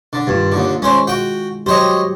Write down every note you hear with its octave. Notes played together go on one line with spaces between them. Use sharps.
D3
G2 D#3 F4
D#2 D3
G#3 C#4 C5
F#4 G5
F#3 G4 C5 C#5 D#5